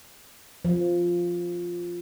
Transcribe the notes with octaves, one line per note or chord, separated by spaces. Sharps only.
F3